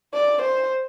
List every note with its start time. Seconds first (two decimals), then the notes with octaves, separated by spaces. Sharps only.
0.14 D5
0.42 C5